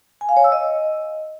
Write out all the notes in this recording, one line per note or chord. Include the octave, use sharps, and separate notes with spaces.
G#5
F5
C#5
E6
D#5